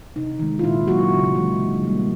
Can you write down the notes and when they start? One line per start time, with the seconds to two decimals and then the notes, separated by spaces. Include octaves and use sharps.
0.16 C3 D#4
0.39 D#3 G#3
0.59 F4
0.64 A#2 E4
0.88 F#3 A#3 F#4
1.12 C#3
1.35 E3 G#3
1.60 D3
1.84 G3 A#3